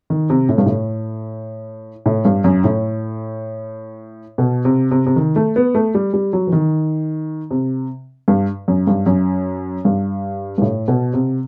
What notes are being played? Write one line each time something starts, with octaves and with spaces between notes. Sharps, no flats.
D#3
C3
A2
G2
A2
A2
G2
F#2
A2
B2
C3
C3
C3
D#3
A3
B3
A3
G3
G3
F#3
E3
D#3
C3
G2
F#2
G2
F#2
G2
G2
A2
B2
C3